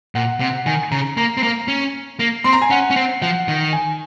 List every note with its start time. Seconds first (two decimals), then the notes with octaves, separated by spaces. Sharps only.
0.15 A#2 F#5
0.40 C3 F#5
0.66 D#3 G#5
0.92 C#3 A#5
1.17 A#3 A#5
1.37 C4
1.43 A#3 A#5
1.68 C#4
2.19 A#3
2.44 C4 C6
2.53 A#5
2.62 G#5
2.70 C#4 F#5
2.90 C#4
2.96 C4
3.21 F3 F#5
3.48 D#3
3.73 G#5